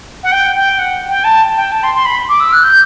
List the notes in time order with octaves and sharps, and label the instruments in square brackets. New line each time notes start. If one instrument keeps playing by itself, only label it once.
[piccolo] F#5
G5
G5
F#5
G5
A5
G5
A5
C6
C6
B5
D6
E6
F#6
G6